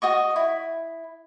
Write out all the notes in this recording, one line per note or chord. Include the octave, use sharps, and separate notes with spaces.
F#4 D#5 C#6
E4